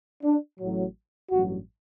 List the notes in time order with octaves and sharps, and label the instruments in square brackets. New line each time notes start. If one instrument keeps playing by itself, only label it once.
[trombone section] D4
A1 A2 F#3
A1 G2 F#3 F#4